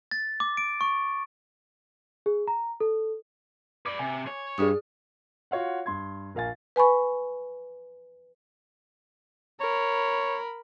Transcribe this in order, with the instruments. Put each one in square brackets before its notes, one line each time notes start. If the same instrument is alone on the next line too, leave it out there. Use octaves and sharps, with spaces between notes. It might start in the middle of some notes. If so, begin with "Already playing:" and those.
[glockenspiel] A6
D6
D7
C#6
[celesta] G#4
A#5
A4
[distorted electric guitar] B4 D5 [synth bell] D6
[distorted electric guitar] C3 [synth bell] G#5
[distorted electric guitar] C#5
[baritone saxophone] G2 [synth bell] G#4 D#6
[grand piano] F4 F#4 C#5 F5 F#5
G2 C6 G#6
A#1 A#4 F5 G#5 A6
[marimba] B4 G#5 B5 C#6
[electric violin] A#4 B5 [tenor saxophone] C#5